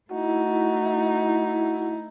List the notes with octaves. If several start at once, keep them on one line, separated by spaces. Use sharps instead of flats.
A3 D#4 E4 F#4